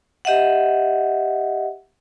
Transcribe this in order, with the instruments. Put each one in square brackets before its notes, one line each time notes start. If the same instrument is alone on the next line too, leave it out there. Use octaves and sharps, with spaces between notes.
[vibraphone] G4 D#5 E5 F#5